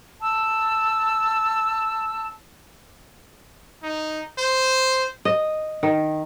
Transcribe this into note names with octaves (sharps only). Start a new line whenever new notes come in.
A5 E6
D#4
C5
D#5
D#3